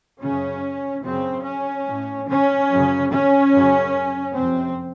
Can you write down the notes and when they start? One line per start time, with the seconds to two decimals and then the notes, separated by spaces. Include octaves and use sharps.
0.21 F#2 C#3 C#4
1.04 F#2 C#3 C4
1.45 C#4
1.86 A2
2.28 C#4
2.70 F#2 C#3
3.11 C#4
3.52 F#2 C#3
4.35 F2 C3 C4